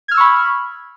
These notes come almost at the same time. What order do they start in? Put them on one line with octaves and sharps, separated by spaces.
G#6 F6 E6 C#6 B5